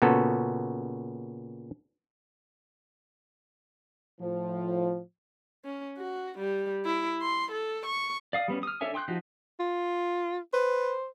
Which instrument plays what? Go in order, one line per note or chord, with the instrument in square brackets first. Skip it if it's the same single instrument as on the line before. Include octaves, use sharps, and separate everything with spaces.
[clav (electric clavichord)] A#2 C#3 B3 F#4 A4
[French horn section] A2 F3
[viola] C#4
F#4
G3
E4
C6
A4
C#6
[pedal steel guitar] D5 F5 D#6
G3 B3 C#4
D#6 F6
D4 A4 C#5 E5 G#5
G5 C6 D#6 F#6 G6
F3 D#4 F#4 G4
[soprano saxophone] F4
[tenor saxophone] B4 [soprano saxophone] C5